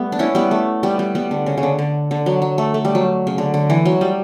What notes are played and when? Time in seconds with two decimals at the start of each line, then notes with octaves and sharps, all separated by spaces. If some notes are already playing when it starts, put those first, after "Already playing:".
Already playing: G3 A3 B3
0.12 D4
0.19 C#4 E4
0.35 G3 B3
0.51 A3
0.83 G3 B3
0.99 G3
1.15 G3 B3
1.31 D3
1.46 C#3
1.57 C#3
1.63 D3
1.79 D3
2.11 D3
2.26 F#3
2.42 F#3
2.58 A3
2.74 A3
2.85 G3
2.95 F#3
3.27 C#3
3.38 D3
3.54 D3
3.70 E3
3.85 F#3
4.01 G3